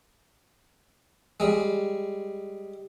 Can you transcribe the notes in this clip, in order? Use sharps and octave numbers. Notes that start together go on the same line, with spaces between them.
G3 G#3